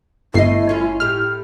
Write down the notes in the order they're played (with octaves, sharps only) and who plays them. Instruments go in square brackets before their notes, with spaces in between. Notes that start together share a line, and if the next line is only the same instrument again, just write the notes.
[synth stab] G1 C7 [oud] A3 D#5 [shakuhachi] E4
[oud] C#4 F4
[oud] A2 G4 [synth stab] F6